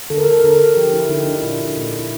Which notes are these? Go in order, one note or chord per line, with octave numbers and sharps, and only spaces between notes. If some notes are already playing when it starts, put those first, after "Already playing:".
D3 A4
A#4
A4
A#4
A4
D3 A#4
A4
F3 G4
E4
D3 D#4
D4
F4
A#2 E4
A#2
E4